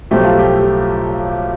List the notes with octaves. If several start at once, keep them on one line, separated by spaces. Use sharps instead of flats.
B1 A2 F3 A3 G4
F4
G4